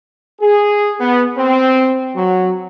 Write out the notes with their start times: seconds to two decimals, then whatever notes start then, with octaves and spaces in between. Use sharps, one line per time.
0.41 G#4
1.00 B3
1.37 C4
2.15 F#3